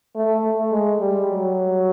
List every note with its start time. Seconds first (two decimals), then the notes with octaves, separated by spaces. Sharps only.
0.16 A3
0.44 A3
0.72 G#3
1.00 G3
1.28 F#3